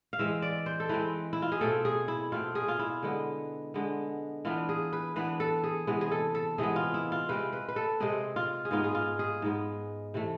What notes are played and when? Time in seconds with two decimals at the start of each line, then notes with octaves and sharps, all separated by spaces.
0.13 F5
0.19 E3 G#3 C4 E5
0.42 D5
0.66 C5
0.80 A4
0.89 E3 G#3 C4 B4
1.33 E4
1.42 F4
1.52 G#4
1.61 B2 A3 C4 A4
1.85 G#4
2.08 E4
2.32 B2 A3 C4 F4
2.55 G#4
2.68 F4
2.79 E4
3.03 D3 G#3 B3
3.74 D3 G#3 B3
4.45 E3 B3 D4 F4
4.69 G#4
4.93 B4
5.16 E3 B3 D4 B4
5.40 A4
5.64 G#4
5.87 C3 E3 G#3 B3
6.01 G#4
6.12 A4
6.35 A4
6.58 C3 E3 G#3 B3 G#4
6.76 F4
6.94 E4
7.12 F4
7.29 C3 G#3 C4 B4
7.53 B4
7.68 B4
7.76 A4
8.00 C3 G#3 C4 G#4
8.36 F4
8.65 G#4
8.71 G#2 G#3 B3 F4
8.84 G#4
8.95 F4
9.19 G#4
9.42 G#2 G#3 B3
10.14 C3 E3 A3